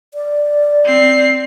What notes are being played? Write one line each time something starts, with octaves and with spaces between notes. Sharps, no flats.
D5
C4 C7